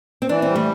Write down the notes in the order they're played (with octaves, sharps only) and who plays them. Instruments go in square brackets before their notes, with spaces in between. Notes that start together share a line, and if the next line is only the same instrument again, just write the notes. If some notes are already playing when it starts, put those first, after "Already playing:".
[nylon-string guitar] C4
[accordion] E3 [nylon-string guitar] D4
[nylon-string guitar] C4
[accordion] G3
[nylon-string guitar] A3